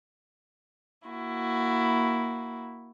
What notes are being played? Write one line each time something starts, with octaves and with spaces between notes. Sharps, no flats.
A#3 E4 F#4